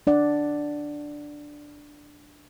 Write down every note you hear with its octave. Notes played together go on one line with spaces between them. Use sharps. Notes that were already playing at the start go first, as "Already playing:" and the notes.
D4 D5 F#5